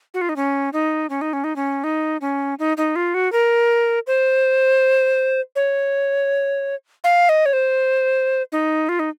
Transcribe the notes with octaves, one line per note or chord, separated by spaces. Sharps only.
F#4
F4
D#4
C#4
D#4
C#4
D#4
C#4
D#4
C#4
D#4
C#4
D#4
D#4
F4
F#4
A#4
C5
C#5
F5
D#5
C#5
C5
D#4
F4
D#4